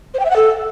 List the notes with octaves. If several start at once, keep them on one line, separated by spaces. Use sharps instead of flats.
C5
G5
E5
F#5
A4